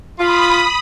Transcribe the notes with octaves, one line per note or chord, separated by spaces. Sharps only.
F4 B5 D#6